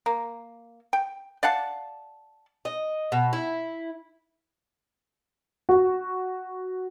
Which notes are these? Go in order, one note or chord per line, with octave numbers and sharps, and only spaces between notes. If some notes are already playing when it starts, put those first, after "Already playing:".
A#3
G5
D5 F5 F#5 A5
D#5
B2
E4
F#4